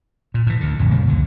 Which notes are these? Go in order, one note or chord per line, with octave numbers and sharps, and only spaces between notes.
A#2
A2 E3
D2 D3
A#1 F2 A2
A#2 C#3 G3 A#3
C#2 F#2 D3 D#3